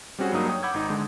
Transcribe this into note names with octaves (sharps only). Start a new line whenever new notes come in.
G3 C4 C#4 F#4 G#4
G2 F#3 A#3 D#4 D#6
C#5 G5 D#6
F#5 B5 D6 E6 G6 G#6
G#1 D#4
D3 G#3